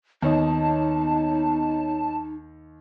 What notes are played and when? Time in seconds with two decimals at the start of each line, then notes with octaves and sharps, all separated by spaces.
0.23 D#2 B3 D#4 C#5 D#5 A5